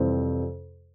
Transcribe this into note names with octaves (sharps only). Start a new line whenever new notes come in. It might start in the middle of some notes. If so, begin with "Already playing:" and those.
Already playing: F2 C3 E3 G3 C4